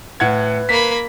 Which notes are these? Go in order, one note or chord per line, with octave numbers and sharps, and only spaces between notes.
A2 B4 F#5 G#6
A#3 B5 B6